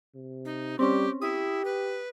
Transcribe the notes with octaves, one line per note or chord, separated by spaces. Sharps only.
C3
D#4
G3 C4 C#4 G4
E4 G4 D#6
B4